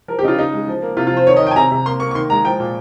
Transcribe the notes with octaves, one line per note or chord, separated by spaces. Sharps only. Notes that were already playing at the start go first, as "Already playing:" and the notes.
F3 A#4
G4
C#3 D#4 F4
C#3 D#4
G#3
F3
A#3
C3 F4
F4
F3
C5
D#3 C#5
D#5
D#3
G5
G#5
C3 A#5
C3
A#3 C6
A#3 C#6
C#6
D#3 C6
G#3 A#5
F3 G5
A#2